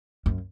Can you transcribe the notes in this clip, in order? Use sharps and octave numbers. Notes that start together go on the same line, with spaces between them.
F#2